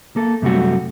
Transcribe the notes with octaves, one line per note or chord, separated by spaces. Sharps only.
A#3 A4
F#2 C3 G3 A3 F#4